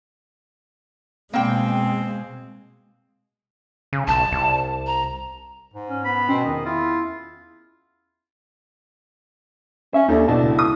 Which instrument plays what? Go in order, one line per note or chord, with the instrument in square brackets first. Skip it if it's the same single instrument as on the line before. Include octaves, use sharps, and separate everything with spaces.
[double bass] B2 G#3 [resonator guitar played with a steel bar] A#3 G5 [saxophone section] C4
[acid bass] C#3
[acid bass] B1 [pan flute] A5
[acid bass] C2
[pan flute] A#5
[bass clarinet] G#2
[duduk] C#4
[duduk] B3 [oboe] B5
[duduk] B2 [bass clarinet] C4 [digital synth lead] C#4
[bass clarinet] E2 [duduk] D#3 [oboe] D#5
[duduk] E4 [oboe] F4
[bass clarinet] C#4 [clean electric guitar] E5
[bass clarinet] D#2 [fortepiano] D4 [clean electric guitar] D#4 A4
[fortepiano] B1 D4 [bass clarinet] E4 [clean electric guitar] A5
[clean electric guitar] C#2
[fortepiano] D#6